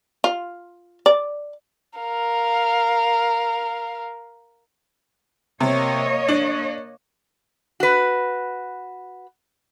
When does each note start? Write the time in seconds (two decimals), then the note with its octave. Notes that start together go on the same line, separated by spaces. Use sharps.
0.24 F4
1.06 D5
1.99 A#4 F5
5.60 C3 A#3 C#5 D#5
6.29 D4
7.80 F#4 B4